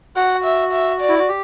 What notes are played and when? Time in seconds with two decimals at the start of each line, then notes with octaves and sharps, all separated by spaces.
0.16 F#4 F#5
0.44 E5
0.72 E5
1.01 D5
1.09 E4
1.19 F#4
1.29 G4